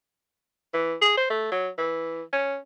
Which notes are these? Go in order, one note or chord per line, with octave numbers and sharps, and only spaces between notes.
E3
G#4
C5
A3
F#3
E3
C#4